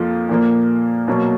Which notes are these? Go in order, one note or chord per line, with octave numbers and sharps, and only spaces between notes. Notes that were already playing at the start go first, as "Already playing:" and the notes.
Already playing: F2 F3 A#3 F4
A#2 F3 A#3
B2 F#3 A#3